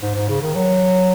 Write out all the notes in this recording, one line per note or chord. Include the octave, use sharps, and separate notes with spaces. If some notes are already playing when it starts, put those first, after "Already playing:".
G#2
G#2
C#3
D#3
F#3